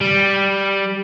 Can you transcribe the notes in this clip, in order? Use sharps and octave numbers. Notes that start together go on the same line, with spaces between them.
G3